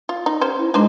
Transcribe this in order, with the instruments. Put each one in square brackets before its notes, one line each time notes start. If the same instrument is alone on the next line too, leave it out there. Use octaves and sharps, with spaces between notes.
[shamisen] F4
D#4
C#4 G4 C5
[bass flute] E4
[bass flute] G#3 [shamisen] D4 D#4 C5